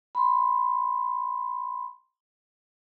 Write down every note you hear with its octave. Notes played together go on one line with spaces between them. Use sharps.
B5 C6